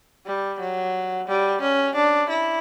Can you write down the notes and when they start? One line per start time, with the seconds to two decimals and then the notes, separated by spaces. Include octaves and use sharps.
0.25 G3
0.59 F#3
1.28 G3
1.61 C#4
1.95 D4
2.29 E4